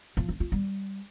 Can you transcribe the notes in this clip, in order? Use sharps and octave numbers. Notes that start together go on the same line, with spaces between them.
F3
D4
F4
G3